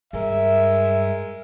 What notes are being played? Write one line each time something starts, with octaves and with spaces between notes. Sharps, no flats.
G2 G#3 A#4 E5